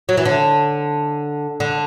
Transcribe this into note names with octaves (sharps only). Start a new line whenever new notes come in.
F#3
E3
D3
D3